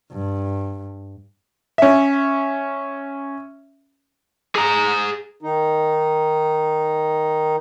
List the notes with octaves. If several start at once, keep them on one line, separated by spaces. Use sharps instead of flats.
G2
C#4 E5
G#4 A#5
D#3 D#4